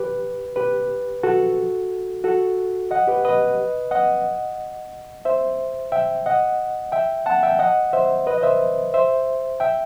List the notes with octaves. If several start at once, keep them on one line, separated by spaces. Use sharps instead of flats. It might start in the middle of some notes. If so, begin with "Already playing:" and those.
Already playing: G4 B4
G4 B4
F#4 A4
F#4 A4
D#5 F#5
G4 B4
B4 D#5
D#5 F#5
C5 E5
E5 G5
D#5 F#5
E5 G5
F#5 A5
E5 G5
D#5 F#5
C5 E5
B4 D#5
D#5
C5 E5
C5 E5
E5 G5